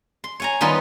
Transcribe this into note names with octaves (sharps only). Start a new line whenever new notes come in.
C6
C#5 G#5 A#5
D#3 F#3 G3 B3 D#4 F4